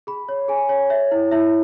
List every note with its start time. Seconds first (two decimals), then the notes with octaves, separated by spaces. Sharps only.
0.07 G#4 B5
0.29 C#5
0.48 G#4 G#5
0.69 C#5
0.90 C#5 E5
1.11 E4
1.31 E4 E5